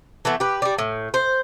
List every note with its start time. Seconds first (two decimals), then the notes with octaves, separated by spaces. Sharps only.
0.25 E3 A3 B3
0.40 G4 B4
0.62 G3 D5
0.78 A2
1.14 C5